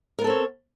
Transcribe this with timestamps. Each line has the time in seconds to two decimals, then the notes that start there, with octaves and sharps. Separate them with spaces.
0.19 A#4
0.21 B3
0.24 A4
0.27 C4
0.30 C#5